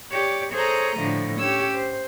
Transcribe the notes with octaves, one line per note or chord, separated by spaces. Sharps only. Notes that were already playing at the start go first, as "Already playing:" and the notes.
G4 C#5 D5
G#4 A4 C5 C#5 D#5 A#5
A2 D3 F3 A3
C#4 G4 C#5 E6 G#6
C5